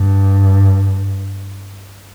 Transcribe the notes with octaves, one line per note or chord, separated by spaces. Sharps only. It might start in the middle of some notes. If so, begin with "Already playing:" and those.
Already playing: G2